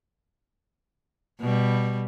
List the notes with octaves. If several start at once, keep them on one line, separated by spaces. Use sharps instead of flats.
B2 G3